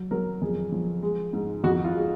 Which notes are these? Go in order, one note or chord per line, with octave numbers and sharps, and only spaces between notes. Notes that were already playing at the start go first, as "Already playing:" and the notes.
Already playing: F#3
F#3 A#4
F2 G#4
F3
G#3
G#2
F2 F#4
F4
G#3